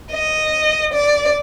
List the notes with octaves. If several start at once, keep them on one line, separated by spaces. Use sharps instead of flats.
D#5
D5